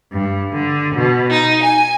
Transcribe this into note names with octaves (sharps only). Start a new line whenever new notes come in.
G2
D3
B2
D#4
G#5